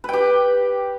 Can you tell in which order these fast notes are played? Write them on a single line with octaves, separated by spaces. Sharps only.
B4 G5 G4